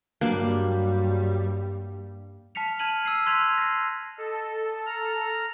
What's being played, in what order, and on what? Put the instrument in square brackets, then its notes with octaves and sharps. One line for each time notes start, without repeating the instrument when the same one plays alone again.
[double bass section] G2 G3 [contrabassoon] F#3 [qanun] A#3 D4
[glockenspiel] A5 F6 B6 C#7 F7
A5 F6 G#6 C#7 D#7 F#7
E6 G#6 C7 D#7
C6 F#6 G#6 B6 D#7 F7
B6
A#6 C7
[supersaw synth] A4 [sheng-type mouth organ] D#5
[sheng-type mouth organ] A#5 F6